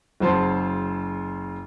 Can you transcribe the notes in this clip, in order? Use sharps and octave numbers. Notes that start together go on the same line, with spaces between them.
F#1 C#3 F#3 C5 A5 C6